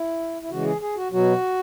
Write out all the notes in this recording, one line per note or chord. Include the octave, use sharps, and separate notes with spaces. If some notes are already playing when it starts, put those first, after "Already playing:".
Already playing: E4
E4
C#3 E3 G#3 F#4
G#4
G#4
F#4
B2 F#3 F#4